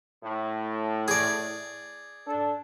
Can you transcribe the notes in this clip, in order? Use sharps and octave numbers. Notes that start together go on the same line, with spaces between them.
A2
G#4 D5
D4 A4